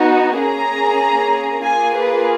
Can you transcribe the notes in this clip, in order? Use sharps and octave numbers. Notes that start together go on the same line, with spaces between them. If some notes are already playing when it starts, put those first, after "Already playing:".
Already playing: B3 D#4 F#4
A#3 C#4 G#4 A#5
A#3 F4 G#4 G#5
B4